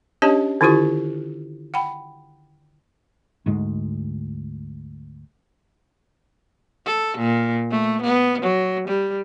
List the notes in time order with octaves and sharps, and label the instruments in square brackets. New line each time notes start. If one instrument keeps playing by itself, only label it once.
[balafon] C#4 D4 G4 C#5 D#5 A5
D3 D#3 E4 F4 G4 C#6
F#5 G5 B5
[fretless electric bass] D2 G#2 G#3
[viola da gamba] A4
A#2
A3
B3
F#3
G3